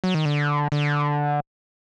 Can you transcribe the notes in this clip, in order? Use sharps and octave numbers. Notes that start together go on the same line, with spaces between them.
F#3
D#3
D3
D3